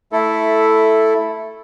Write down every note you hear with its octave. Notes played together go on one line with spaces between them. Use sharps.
A3 E4 A4